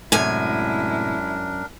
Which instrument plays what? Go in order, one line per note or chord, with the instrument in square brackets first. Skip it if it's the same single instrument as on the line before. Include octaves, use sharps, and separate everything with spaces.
[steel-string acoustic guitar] F#2 G#5 [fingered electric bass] A2 C3 [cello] G#3 E4 [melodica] D4 A#4